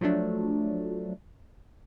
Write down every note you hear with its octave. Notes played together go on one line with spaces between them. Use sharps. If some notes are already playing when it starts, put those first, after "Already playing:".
F3 F#3 A3 D4